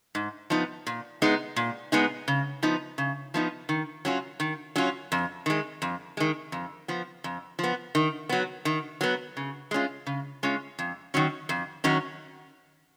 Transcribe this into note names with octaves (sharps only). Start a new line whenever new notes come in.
G#2
F3 B3 D#4
A#2
G#3 B3 D#4
A#2
G#3 B3 D#4
C#3
F3 B3 D#4
C#3
F3 B3 D#4
D#3
F#3 C#4 F4
D#3
F#3 C#4 F4
F2
D#3 G#3
F2
D#3 G#3
F2
F3 B3
F2
F3 B3
D#3
F#3 B3
D#3
F#3 B3
C#3
G#3 C#4 F4
C#3
G#3 C#4 F4
F2
D#3 F#3 C#4
F2
D#3 F#3 C#4